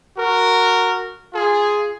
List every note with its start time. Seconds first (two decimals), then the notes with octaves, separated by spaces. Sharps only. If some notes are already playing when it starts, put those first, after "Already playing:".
0.17 F#4 A#4
1.33 F4 G#4